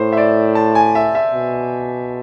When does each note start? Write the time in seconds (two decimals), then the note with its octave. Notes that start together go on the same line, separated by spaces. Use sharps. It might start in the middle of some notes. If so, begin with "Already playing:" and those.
Already playing: A2 C5
0.12 E5
0.17 D5
0.55 A5
0.75 G#5
0.95 E5
1.15 E5
1.33 B2